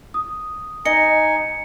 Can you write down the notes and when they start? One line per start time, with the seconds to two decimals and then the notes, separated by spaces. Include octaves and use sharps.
0.14 D#6
0.85 D#4 D#5 G#5 C#7